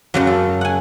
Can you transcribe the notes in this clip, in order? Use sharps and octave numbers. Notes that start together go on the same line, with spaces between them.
F#2 C#3 F#3
A4
F#5 G#5